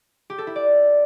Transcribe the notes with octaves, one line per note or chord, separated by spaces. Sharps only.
G4
A4
E4
D5